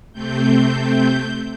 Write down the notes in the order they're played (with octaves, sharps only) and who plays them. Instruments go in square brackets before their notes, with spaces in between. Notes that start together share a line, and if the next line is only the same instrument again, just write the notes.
[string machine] C3 A3 C4 G6